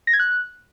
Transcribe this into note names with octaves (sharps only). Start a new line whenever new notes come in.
A#6
G#6
F#6